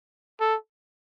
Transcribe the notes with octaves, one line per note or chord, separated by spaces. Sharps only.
A4